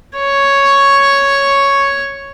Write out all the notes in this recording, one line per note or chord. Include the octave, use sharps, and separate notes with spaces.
C#5 C#6